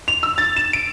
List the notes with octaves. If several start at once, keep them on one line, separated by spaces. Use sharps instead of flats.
F7
E6
A6
E7
D7